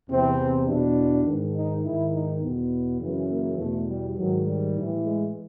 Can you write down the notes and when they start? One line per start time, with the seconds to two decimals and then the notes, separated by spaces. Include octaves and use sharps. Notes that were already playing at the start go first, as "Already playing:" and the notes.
0.09 E2 C3 E3 C4
0.68 E2 B2 D4
1.26 G#2 D#3
1.56 D#4
1.85 G#2 D#3 E4
2.13 D#4
2.42 E2 B2 B3
3.01 F#2 C#3 E3
3.30 A#3
3.58 E2 B2 A3
3.88 G3
4.17 G#2 D#3 F#3
4.46 G3
4.75 A2 E3
5.04 G#3